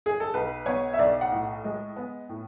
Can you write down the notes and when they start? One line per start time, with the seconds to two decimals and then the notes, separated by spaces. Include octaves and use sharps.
0.06 G#4
0.20 A4
0.34 B1 B4
0.66 B3 C#5
0.93 E5
0.99 B1 D5
1.21 F#5
1.32 A2
1.64 G#3
1.96 B3
2.29 A2